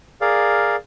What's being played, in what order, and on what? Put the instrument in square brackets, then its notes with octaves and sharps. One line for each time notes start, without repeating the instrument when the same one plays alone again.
[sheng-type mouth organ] G#4 A#4 D5 F5